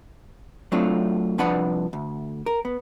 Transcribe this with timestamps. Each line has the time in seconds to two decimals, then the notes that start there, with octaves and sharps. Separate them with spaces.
0.72 F#3 A3 C4 D4 F4
1.38 C2 F3 D4 B4 F#5 B5
1.93 D2
2.46 A#4
2.65 B3